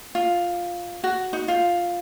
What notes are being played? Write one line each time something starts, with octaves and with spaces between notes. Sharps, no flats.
F4
F#4
D#4
F4